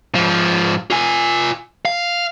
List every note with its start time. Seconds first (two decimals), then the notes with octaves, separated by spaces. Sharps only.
0.15 G#2 F3
0.90 F4 G#5
1.85 F5